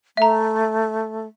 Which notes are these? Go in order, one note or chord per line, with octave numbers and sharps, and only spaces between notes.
A3 E5 A#5